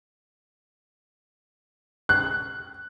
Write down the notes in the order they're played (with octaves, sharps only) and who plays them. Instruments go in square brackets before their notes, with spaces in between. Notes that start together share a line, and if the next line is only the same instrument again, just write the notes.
[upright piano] F#6